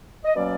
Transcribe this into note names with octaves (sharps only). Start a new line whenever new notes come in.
D#5
B2 F#3 A#3 C#4 D5